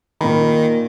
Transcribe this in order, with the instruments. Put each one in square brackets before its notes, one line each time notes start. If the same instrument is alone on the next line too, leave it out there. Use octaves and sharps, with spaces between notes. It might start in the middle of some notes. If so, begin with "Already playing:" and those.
[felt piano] A#2 A#3 B5 [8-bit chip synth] D#3